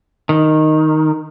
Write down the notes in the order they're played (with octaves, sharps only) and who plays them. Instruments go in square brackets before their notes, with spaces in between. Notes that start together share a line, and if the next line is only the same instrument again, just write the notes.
[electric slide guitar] D#3